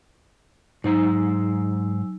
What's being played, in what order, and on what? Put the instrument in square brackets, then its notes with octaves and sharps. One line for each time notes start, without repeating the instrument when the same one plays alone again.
[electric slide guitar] G#2 C5 A#5 [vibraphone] F#3 G#5 E6 [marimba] D#4